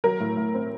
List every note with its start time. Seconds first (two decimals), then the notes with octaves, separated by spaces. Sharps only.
0.04 F#3 A#4
0.20 A2
0.37 A2
0.54 C4